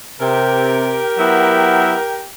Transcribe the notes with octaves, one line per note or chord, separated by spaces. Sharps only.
C3 G4 A#4 G5
F#3 B3 E4